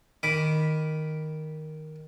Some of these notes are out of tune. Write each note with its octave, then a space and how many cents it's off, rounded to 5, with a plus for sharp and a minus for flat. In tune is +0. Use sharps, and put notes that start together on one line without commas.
D#3 +0 B5 -5 D6 -10